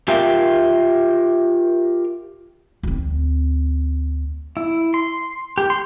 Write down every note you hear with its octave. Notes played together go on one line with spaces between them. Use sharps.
F4 G4 A#4 E5 F5 G5
D2 C4
E4
C6
G4
C6